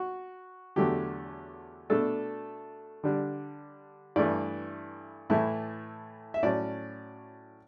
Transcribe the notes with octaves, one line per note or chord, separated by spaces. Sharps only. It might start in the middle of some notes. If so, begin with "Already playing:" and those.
Already playing: F#4
E2 D3 F#3 A3 G4
B2 A3 D4 A4
D3 G3 D4
G2 E3 A3 D5
A2 E3 A3 E4
E5
A2 F#3 C#4 D5